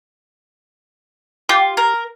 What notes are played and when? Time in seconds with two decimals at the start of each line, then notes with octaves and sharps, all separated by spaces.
1.49 F4 G4
1.77 A#4